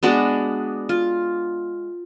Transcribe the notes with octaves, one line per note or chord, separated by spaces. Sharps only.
G#3 B3 D4 F#4
F4